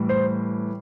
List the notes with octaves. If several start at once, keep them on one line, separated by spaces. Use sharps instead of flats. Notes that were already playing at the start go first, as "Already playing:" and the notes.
Already playing: A2 E3 G3
C5